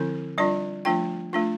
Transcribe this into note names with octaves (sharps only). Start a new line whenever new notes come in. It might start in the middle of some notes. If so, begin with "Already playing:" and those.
Already playing: D3 F3 C4 E4
G3 D4 F4 D5
F3 A3 D4 F4 G5
A3 D4 F4